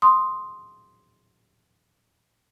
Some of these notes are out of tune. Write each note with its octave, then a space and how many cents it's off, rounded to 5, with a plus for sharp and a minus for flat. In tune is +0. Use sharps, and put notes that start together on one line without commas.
C6 +0 D#6 +0